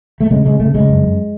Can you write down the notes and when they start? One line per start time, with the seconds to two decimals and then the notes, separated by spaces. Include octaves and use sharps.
0.21 A3
0.31 C#3 G#3
0.45 C#3 G#3
0.60 C#3 A3
0.74 C#3 G#3
0.89 F#2
1.03 F#2